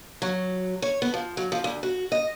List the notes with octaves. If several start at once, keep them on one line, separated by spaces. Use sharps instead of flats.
F#3
C#5
B3
F3
F#3
F3
D2
F#4
D#5